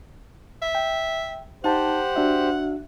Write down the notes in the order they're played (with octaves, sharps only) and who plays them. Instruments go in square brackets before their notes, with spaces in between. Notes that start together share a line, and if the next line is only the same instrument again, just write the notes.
[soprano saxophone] E5
[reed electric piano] G5
[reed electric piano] D#4 A5 [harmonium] G4 C5 [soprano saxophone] F#5
[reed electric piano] D4 F#4 E5